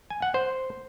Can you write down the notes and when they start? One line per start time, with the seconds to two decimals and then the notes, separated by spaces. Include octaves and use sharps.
0.10 G#5
0.22 F#5
0.34 C5